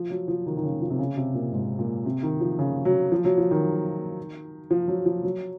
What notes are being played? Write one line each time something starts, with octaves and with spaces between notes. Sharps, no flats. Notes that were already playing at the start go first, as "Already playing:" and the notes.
Already playing: F3
F#3
F3
D#3
D#3
C#3
F3
C3
C#3
C3
A#2
G#2
A#2
C3
D#3
F3
C#3
F#3
F3
F#3
F3
D#3
F3
F#3
F3
F#3